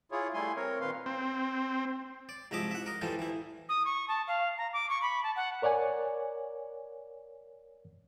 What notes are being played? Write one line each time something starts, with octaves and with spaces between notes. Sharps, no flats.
E4 F4 G#4 C#5
G3 A3 E4 G#5 C6
C4 A#4 C#5
A#2 D#3 C4 B4 F5 C6
C4
D5
C2 G#2 F3 D#5 E5 D6
E5 F#5
A#4 D#5
A1 E3 G3 F4 A4 C5
E3 E4
D#6
C#6
A5
F5
A#5
D6
C#6
B5
A5
F#5
A#4 C#5 D5 F#5 G#5